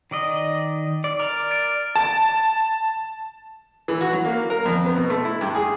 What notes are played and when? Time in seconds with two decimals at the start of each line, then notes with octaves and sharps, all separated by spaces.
0.11 D#3 D5 D#5
1.04 D5
1.20 A#4 D5 F6 D7 F7
1.51 A6 D7
1.96 A5
3.88 E3
4.01 F#4
4.13 F#3
4.25 A#3
4.50 A#4
4.65 F2
4.86 B3
4.98 B2
5.10 A3
5.25 E4
5.41 G2
5.55 G#4